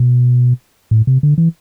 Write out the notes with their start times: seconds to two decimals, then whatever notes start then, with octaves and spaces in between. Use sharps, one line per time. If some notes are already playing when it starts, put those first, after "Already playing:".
Already playing: B2
0.91 A2
1.07 C3
1.23 D3
1.38 E3